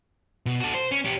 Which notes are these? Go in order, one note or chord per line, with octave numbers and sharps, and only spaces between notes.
B2
F#4 A4
C5
C#4
C#4 G4